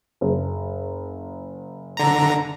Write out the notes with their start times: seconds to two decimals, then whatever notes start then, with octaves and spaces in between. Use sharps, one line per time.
0.21 F#1
1.97 D3 A#5